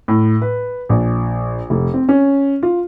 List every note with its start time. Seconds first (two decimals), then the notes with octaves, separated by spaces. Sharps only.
0.08 A2
0.42 B4
0.89 A#1
1.70 F1
1.94 C4
2.09 C#4
2.63 F4